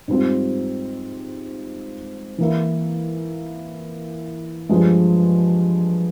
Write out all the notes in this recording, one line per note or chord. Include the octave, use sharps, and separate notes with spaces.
G#2 G3 C4 F4
E3 A#3 E4
G2 F3 G#3